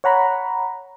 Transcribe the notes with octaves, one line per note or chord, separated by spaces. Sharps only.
C#5 F#5 A#5 B5